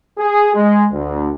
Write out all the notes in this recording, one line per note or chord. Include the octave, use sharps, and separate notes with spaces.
G#4
G#3
D2